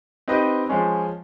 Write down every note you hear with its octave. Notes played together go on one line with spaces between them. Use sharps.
C4 D#4 G4 B4 D#5
F3 G#3 C#4